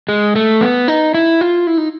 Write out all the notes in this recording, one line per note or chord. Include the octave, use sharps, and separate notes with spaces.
G#3
A3
B3
D#4
E4
F4
E4
D#4